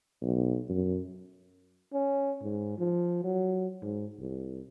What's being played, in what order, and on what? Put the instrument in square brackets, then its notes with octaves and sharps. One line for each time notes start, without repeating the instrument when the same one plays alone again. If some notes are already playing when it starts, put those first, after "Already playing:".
[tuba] B1
F#2
[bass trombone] C#4
G#2
F3
F#3
G#2
C2